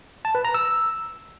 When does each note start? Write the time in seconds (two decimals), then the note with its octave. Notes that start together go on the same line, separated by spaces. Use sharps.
0.25 A5
0.35 B4
0.45 A#5
0.54 E6